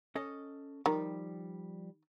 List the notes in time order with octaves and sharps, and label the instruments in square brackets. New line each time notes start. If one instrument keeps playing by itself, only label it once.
[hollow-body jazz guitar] C#4 A4 D#5
[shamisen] D#3 [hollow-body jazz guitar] F3 G3